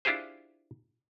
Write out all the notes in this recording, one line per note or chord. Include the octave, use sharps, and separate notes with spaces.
D4 E4 F4 G4 G#4 C5